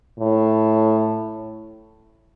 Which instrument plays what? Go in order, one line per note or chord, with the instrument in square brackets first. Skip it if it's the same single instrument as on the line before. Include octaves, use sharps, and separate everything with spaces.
[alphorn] A2